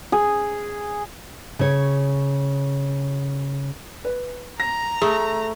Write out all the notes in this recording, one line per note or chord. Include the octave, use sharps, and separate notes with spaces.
G#4
C#3 C#5
B4
A#5 A#6
A3 G#4